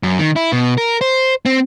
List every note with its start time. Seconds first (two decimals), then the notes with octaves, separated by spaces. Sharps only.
0.03 F#2
0.19 D#3
0.36 E4
0.52 B2
0.78 A#4
1.01 C5
1.46 C4